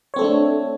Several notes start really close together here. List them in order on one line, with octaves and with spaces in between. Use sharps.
C#5 C4 A4 A3 D4